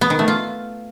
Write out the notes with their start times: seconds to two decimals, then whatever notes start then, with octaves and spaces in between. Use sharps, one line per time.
0.01 B3
0.10 D#3
0.19 A3
0.28 F4